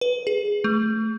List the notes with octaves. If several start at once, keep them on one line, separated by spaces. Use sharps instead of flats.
B4
G#4
A3